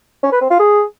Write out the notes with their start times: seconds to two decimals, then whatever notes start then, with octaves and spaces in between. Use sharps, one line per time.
0.23 C#4
0.32 B4
0.41 C4
0.50 F4
0.59 G#4